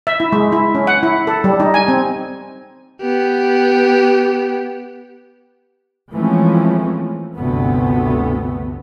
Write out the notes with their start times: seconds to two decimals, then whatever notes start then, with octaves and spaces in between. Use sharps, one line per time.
0.07 E5
0.20 E4
0.32 G#3
0.52 E4
0.75 C#4
0.87 F#5
1.03 E4
1.27 A4
1.44 G3
1.60 D#4
1.74 G#5
1.88 C4
3.02 B3 G4
6.12 E3 F3 G#3 A3 C4 C#4
7.38 G1 D2 C3 A3 B3